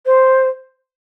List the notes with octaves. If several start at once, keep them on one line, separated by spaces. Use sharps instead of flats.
C5